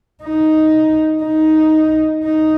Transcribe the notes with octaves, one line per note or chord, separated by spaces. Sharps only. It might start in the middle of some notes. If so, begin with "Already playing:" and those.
D#4
D#4
D#4